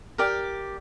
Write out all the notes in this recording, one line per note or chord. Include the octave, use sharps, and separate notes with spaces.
G4 A#4 D5 G5